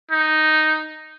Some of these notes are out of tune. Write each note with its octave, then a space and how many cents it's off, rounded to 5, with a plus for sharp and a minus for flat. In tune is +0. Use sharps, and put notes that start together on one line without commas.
D#4 +0